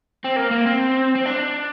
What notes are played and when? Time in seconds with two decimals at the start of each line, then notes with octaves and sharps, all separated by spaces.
0.25 C4
0.36 A#3
0.51 A#3
0.67 C4
1.16 C4
1.26 D4